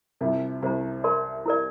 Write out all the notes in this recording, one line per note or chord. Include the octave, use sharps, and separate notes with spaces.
C2 C3 F4 A#4 E5 A5
C2 C3 G4 C5 E5 A#5
A#4 D5 A5 C6
E4 A#4 D5